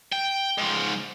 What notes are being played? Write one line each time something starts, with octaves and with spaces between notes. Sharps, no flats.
G5
G#2 F3